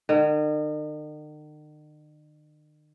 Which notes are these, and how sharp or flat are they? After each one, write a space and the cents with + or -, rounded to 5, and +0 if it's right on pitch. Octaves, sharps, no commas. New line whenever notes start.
D#3 -45